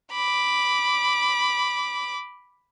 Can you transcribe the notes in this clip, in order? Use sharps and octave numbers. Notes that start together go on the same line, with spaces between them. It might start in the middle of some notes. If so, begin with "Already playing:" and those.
B5 D6